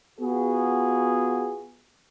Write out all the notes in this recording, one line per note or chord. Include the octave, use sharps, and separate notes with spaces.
B3 F4 F#4 G#4